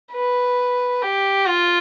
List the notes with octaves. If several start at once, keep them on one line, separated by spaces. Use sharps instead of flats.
B4
G4
F4